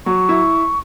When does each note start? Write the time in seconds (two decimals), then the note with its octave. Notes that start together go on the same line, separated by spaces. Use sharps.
0.06 F#3 C#6
0.29 E4